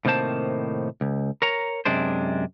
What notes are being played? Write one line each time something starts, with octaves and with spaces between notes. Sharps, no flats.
A2 C3 D#3 A#3 C5 A5
C#2
A#4 C#5 A#5
F#2 C3 G#3 D4 C5